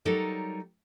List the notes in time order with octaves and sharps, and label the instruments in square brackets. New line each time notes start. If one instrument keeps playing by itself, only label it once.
[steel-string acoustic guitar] F#3 G3 D#4 A4 A#4 C#5